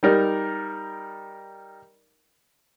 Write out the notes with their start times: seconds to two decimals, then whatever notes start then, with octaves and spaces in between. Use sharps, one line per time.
0.03 G3 D#4 A#4 D5